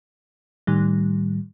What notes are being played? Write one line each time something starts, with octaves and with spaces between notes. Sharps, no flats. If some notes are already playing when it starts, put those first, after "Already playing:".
A2 D#3 G3